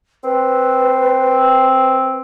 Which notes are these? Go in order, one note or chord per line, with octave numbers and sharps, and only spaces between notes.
C4 B4